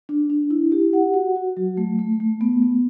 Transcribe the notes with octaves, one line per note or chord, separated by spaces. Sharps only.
D4
D4
E4
G4
F#5
F#4
F#4
F#3
A3
A3
A3
B3
B3